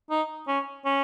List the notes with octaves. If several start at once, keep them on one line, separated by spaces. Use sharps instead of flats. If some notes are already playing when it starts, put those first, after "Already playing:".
D#4
C#4
C#4